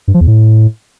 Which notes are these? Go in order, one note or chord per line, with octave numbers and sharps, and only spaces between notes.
G2
F3
E2
A2